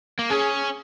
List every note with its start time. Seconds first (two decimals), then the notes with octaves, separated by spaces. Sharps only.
0.19 A#3
0.30 C#4 G#4